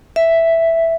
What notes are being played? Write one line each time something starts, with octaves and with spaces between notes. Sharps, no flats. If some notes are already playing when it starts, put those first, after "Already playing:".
E5